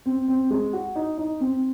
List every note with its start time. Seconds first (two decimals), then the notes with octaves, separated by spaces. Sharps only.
0.06 C4
0.28 C4
0.50 G#3
0.73 F#4
0.95 D#4
1.18 D#4
1.40 C4